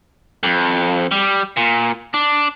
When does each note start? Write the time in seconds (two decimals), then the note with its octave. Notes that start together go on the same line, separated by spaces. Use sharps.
0.43 F2
1.12 G3
1.57 A#2
2.14 D4